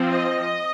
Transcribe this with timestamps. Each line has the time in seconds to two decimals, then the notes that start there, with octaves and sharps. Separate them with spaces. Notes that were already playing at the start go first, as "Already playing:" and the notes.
Already playing: F3 C4
0.11 D#5